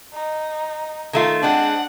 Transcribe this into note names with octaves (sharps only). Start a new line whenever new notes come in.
D#4
D#3 A3 F4
G#3 C4 D4 F#5